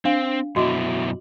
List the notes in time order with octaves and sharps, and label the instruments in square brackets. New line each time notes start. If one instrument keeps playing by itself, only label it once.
[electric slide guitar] C4 [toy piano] D4 F5
[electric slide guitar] F#2 B2 E4 [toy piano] F#4 D#5 D6